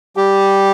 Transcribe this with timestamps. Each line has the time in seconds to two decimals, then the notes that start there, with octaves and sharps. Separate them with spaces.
0.17 G3 G4